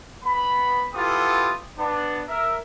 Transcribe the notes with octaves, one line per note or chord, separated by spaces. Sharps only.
B3 B5
B3 E4 F4 G4 A4 D#6
B3 D4
A#4 E5